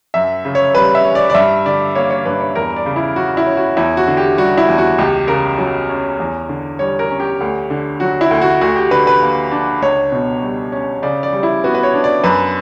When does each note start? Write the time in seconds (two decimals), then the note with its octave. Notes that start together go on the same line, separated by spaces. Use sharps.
0.14 F#2 E5
0.45 C#3
0.55 C#5
0.75 G3 B4
0.95 E5
1.04 C#4
1.15 D5
1.30 D5
1.34 G2 E5
1.66 D3 D5
1.95 A#3 C#5
2.10 C#5
2.25 G2 B4
2.40 C#5
2.55 E2 A#4
2.76 D5
2.86 C#3
2.96 E4
3.16 F#3 F#4
3.37 E4
3.47 C#4
3.57 F#4
3.76 E2 E4
3.97 F#4
4.07 D3
4.17 G4
4.38 G3 F#4
4.58 E4
4.68 E2
4.78 F#4
4.98 C#2 G4
5.28 C#3 A#4
5.58 F#3
5.89 C#4
6.20 E2
6.49 D3
6.79 G3 C#5
6.99 A#4
7.10 C#4
7.20 G4
7.41 D2
7.70 D3
8.00 F#3 F#4
8.21 E4
8.31 D2
8.41 F#4
8.61 D2 F#4
8.76 G4
8.91 D3 B4
9.07 B4
9.22 A#3
9.52 D4
9.81 C#2 C#5
10.12 B2
10.42 G3
10.72 C#4
11.02 C#3 D5
11.23 D5
11.33 G3
11.43 E4
11.64 B3 F#4
11.74 B4
11.83 C#5
11.94 D4
12.04 D5
12.24 F#2 B4